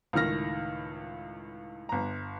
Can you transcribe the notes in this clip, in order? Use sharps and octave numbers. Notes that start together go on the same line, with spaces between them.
C#2 A2 D#3 F6 A#6
G1 A#5